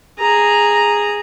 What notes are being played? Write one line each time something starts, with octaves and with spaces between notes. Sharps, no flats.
G#4 A#5